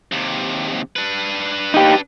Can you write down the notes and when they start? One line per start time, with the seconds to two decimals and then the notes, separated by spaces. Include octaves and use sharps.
0.12 D#2 C3
0.96 D4 B4
1.74 D#4 G4